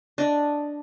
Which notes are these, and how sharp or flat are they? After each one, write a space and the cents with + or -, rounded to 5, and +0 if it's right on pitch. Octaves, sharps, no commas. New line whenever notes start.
D4 +0 D#5 +0